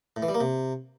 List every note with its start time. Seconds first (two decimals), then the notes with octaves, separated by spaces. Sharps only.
0.16 A2
0.22 E3
0.28 G3
0.34 A#3
0.41 C3